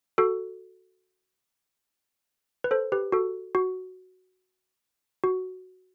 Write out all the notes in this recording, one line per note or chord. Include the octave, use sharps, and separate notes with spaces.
F#4 A4
B4
A4 C5
G4 B4
F#4 A4
F#4
F#4